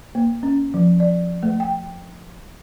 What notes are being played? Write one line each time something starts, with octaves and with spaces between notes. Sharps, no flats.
A#3
C#4
F3
D5
A3
G5